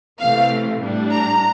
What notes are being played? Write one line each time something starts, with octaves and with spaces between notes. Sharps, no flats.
C3 E3 A3 C4 F5
A2 G3 D4
A#5